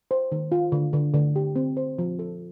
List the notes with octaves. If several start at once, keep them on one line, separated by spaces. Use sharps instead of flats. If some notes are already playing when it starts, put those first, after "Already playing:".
C5
D#3
F4
D3
D3
D3
G4
C4
C5
F3
A4